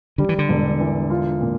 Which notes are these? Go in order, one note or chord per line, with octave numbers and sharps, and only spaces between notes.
D3 G3
E3
D3
E1
E3
F4
A#2